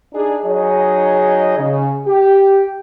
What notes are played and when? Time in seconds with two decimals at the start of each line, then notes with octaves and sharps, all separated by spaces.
0.13 D4 D#4 G#4
0.45 F#3 D#4 G#4 C#5 D#5
1.57 C#3
2.07 G4